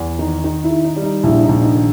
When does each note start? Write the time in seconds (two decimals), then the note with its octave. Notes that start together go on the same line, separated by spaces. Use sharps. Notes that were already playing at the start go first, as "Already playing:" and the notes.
Already playing: E2
0.19 D#3 D#4
0.44 D#3 D#4
0.64 E4
0.70 D#3
0.84 D#4
0.96 G3
1.03 D#4
1.23 A#1 E4
1.42 D#4
1.49 A#1
1.62 D#4
1.75 D#3